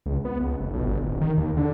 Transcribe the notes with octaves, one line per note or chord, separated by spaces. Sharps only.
C#2
B3
C#2
F1
B1
G1
D1
D#3
D#2
D3